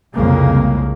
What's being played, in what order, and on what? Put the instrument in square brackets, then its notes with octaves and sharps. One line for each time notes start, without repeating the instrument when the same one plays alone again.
[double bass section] C2 F2 C#3 G#3 A#3